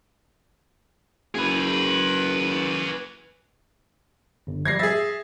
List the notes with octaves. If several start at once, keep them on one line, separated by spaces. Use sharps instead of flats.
F#1 G#4 B4
G1
F3 G3 G#6 A#6 C7
G#4 E5 A6